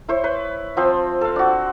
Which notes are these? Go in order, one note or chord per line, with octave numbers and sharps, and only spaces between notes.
E4 C5 C#5
B4
F3 C4 C5
A4 F5
D4 F#4